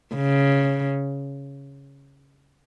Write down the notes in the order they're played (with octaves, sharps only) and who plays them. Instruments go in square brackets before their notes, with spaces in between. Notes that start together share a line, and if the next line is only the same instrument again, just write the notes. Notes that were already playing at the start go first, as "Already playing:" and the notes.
[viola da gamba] C#3